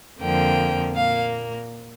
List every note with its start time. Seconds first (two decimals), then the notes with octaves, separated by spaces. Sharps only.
0.21 F2 D3 F3 A#3 G5
0.95 A#2 A#3 F5